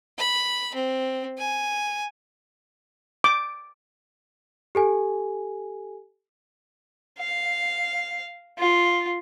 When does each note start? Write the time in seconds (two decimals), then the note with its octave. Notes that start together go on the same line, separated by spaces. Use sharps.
0.19 B5
0.75 C4
1.38 G#5
3.24 D6
4.75 G4 A4 G#5
7.19 F5
8.59 F4